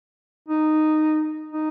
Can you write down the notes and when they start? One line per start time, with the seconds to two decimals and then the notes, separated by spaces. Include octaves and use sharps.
0.48 D#4
1.53 D#4